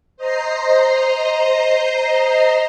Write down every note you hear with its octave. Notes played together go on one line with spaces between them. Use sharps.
C5 D#5 A#5 C7